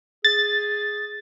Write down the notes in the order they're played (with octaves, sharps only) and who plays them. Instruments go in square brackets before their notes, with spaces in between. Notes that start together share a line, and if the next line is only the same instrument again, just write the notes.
[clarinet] G#4 [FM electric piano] A6